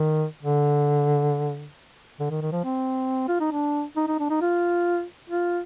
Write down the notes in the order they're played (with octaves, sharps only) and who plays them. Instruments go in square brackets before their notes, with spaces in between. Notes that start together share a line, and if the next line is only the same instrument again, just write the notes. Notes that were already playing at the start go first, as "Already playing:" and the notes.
Already playing: [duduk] D#3
D3
D3
D#3
D#3
F3
C4
F4
D#4
D4
D#4
D#4
D4
D#4
F4
F4